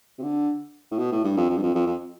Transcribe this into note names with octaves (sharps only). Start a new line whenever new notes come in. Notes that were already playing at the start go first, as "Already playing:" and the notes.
C3
D3
A2
B2
A2
G2
F2
F2
G2
F2
F2
F2